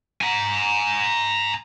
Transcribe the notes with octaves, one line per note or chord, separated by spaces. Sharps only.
G#5 A#5